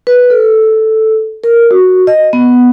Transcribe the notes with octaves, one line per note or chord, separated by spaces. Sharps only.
B4
A4
A#4
F#4
D#5
B3